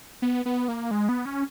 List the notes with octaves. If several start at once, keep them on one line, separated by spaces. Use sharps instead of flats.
B3
B3
A#3
G#3
B3
C#4